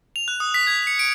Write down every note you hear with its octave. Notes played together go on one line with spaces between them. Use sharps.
F7
F#6
D#6
B6
G#6
C#7
D7